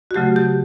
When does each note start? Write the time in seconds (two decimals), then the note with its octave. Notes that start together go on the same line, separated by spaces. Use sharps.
0.11 F#4
0.14 C#3 F#3 A3 G4
0.36 G4